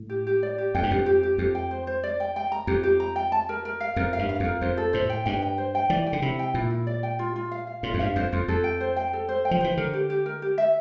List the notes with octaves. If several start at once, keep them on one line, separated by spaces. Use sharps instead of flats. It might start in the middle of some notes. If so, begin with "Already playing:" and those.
Already playing: A2
G4
G4
D5
G4
F2 G5
G2
F2 G4
G4
G4
F2 G4
G5
C5
C5
D5
G5
G5
A#5
F2 G4
G4
A#5
G5
A5
A#4
A#4
F5
F2 A#4
F5
G2
F5
F2 A#4
F2 C5
A4
A2 C5
G5
G2 G5
G5
C5
G5
E3 D5
G5
D3
C3 E4
G5
A#2 E4
E4
D5
G5
F4
F4
F5
F5
A2 F4
F2
G2 F5
F2 C5
F2 F4
F2 A4
G5
C5
G5
A4
C5
G5
F3
E3 C5
D3 A#4
G4
G4
A#4
G4
E5